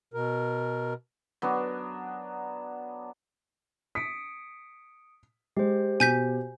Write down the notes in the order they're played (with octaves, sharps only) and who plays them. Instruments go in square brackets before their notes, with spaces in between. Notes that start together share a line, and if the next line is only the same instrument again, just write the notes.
[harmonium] B2 A#4
[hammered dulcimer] F#3 B3 D4
[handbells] D#6 C#7 D7 [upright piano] B6
[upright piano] G#3 [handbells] G4 C5
[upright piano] B2 [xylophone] G#5 G6 B6